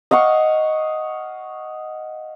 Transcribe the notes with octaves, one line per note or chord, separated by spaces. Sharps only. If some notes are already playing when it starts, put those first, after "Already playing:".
D#5 F5 F#5 C#6